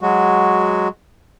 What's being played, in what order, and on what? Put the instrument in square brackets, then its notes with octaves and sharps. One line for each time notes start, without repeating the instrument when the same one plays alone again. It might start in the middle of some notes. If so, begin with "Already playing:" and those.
[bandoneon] F#3 G#3 F#4